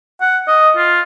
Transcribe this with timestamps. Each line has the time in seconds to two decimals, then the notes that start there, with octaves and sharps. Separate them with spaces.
0.21 F#5
0.48 D#5
0.77 F4